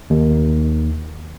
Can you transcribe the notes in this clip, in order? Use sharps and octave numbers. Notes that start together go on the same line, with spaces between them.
D#2